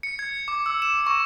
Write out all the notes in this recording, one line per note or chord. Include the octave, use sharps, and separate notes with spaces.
C#7
G#6
D6
E6
E7
C#6